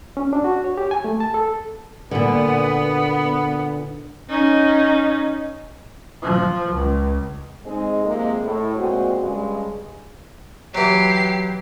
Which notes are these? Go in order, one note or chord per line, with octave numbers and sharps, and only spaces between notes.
C#4
D4
F#4
C#5
G4
G#5
A3
A5
A4
A#2 D3 B3
C#4 D#4
F3
C#2
G#3 C4 D#4 G#4 D#5
C3 F3 G#3 A#3
A2
A#2 G#3 C4 F#4
G2 C#3 G3 G#3
E3 F#3 G4 C7